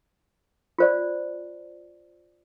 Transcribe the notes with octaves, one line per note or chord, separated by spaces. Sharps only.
F4 C5 D5